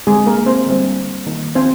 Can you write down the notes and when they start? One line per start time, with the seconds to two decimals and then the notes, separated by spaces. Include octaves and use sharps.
0.07 D3 G#3 C4 G#4
0.27 A#3 A#4
0.46 C4 C5
0.67 D3 G3 C4
1.26 D#3 A#3
1.55 C4 C5